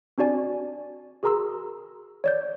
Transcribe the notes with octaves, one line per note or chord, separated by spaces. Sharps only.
C4 D4 F#4 D5 G#5
F#4 G#4 A#4 A#5 C6 E6
C#5 D5 G6